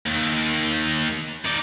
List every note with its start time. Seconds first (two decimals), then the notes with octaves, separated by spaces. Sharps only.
0.06 D#2
1.45 D#4 D5